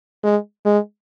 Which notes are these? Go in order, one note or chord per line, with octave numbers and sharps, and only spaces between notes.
G#3
G#3